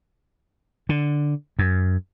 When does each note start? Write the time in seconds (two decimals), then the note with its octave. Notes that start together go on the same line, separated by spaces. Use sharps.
0.89 D3
1.59 F#2